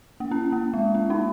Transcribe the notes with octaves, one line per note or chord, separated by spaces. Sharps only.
A#3
C#4
A#3
G#3
C#4
A#3 D#4